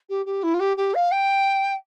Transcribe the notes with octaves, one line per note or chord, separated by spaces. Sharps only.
G4
G4
E4
F4
G4
G4
F5
G5